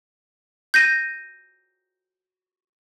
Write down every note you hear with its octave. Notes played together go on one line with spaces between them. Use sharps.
G6 A#6 D#7